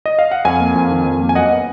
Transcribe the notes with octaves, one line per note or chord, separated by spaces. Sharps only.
D#5
F5
F#5
F2 F5 G#5
A#3
F2
D#3
F2
A#3
G#5
F#2 D#5 F#5
B3